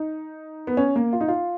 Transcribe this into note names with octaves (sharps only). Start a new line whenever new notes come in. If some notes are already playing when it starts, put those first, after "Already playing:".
Already playing: D#4
B3
C#4
A#3
F4
D#4
F4